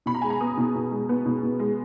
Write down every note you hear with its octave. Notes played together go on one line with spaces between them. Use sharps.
B2 B5
A#5
G#3 G#5
A#5
B3 D#6
B2
B2
G#3
B3
B2
B2
G#3